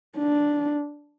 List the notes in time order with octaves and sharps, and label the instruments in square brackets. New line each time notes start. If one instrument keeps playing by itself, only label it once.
[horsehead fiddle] D4